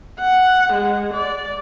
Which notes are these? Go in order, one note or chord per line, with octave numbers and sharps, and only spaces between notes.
F#5
G#3
D5